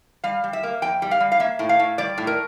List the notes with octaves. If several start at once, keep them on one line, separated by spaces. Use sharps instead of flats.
G3 F5
G3
E5
A#3
F2 G5
G3
F5
G3
F5
A#3 E5
A2
F5
A2
G3 D5
A2
A#4